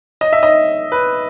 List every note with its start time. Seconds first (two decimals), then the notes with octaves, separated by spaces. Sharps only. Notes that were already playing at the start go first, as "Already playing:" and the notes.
0.21 D#5
0.33 E5
0.43 D#5
0.92 B4